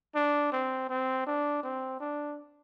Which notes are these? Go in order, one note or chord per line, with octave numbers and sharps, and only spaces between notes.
D4
C4
C4
D4
C4
D4